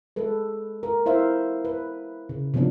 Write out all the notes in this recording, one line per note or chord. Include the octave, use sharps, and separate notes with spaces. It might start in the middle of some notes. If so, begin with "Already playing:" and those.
G#3 A4 B4
A#4
E4 C5 E5 F5
B4
C#3
C3 F3 B3 C#4 D4